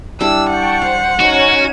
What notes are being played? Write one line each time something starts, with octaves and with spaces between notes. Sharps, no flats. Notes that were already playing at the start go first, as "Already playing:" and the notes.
G3 D4 E4 E6
F#5 G5 A5 C#6
C5 F5
C#4 D#4 F#4 C#5 D#7